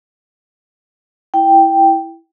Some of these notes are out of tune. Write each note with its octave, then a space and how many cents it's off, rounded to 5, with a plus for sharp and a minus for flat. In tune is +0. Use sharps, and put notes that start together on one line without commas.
E4 +0 G5 +0